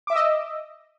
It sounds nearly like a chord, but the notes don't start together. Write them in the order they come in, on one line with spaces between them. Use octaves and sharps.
D6 E5 E6 D#5